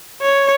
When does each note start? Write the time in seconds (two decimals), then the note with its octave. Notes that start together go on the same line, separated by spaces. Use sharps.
0.22 C#5